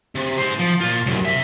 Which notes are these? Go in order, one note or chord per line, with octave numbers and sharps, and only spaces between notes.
C3
G#2 C5
F3
A#2 F4
C2 F#2
C3 E5